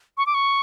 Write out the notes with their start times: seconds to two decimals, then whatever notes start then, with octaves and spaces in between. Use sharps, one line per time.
0.18 C#6
0.26 D6
0.34 C#6